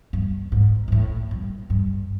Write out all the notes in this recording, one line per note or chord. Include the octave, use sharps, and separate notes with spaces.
G2
G#2
A#2
A2
G2
G2